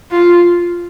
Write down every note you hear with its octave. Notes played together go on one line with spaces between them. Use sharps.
F4